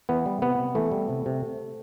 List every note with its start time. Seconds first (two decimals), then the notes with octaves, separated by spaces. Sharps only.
0.09 E3 B3
0.26 G3
0.42 C3 B3
0.58 C3
0.75 E3 A3
0.92 G3
1.09 C3
1.26 C3